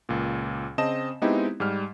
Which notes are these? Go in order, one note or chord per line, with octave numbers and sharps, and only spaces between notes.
C#2 A#2
C#3 C4 D#5 A5 E7
G#3 B3 C4 D#4 E4 G4
G#2 G3 F6